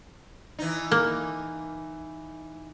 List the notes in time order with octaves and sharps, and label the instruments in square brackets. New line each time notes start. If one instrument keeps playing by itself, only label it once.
[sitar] E3 D#4
[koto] A#3